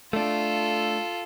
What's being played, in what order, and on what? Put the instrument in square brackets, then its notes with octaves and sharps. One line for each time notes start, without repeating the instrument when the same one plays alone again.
[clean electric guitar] A3 D4 [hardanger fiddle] F4 A4